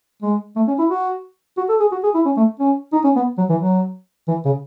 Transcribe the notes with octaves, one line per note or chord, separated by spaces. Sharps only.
G#3
A3
C#4
E4
F#4
F#4
A4
G#4
F#4
G#4
E4
C#4
A3
C#4
D#4
C#4
B3
F#3
E3
F#3
E3
C#3